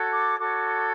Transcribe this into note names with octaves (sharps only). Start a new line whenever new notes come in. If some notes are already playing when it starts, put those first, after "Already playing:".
Already playing: F#4 A4 C#5
D6
F#4 A4 C#5 D6